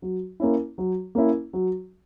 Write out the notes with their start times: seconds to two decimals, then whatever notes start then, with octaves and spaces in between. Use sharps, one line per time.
0.02 F#3
0.40 A#3 C#4 E4
0.78 F#3
1.15 A#3 C#4 E4
1.53 F#3